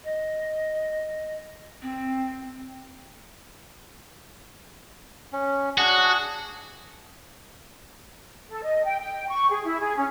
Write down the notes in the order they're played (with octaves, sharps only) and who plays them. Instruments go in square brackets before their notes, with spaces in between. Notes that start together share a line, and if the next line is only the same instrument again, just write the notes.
[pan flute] D#5
C4
[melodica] C#4
[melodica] D4 G#4 [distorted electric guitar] F#4
[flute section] A4
D#5
G5
G5
C#6
G#4
E4
G#4
C#4